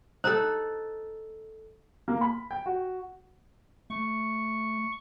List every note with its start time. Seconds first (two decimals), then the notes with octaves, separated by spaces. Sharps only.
0.24 D#4 A4 C5 A#5
2.08 A#3
2.21 B5
2.51 G5
2.66 F#4
3.90 A3 C#6